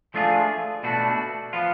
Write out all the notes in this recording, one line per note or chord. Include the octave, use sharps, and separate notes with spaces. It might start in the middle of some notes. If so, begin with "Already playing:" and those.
F3 A3 D4 F4 G#4
B2 A3 D4 F#4
F3 B3 F4